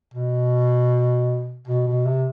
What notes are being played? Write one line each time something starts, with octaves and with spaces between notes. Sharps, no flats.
B2
B2
B2
C3